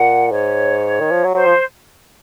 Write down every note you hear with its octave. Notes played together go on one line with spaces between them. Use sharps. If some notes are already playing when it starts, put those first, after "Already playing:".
Already playing: A#2 F#5
G#2 C#5
D#3
F3
F#3
F#3 C5
F3